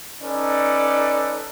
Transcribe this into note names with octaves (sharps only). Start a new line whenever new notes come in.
C#4 D#4 A4 B4 D5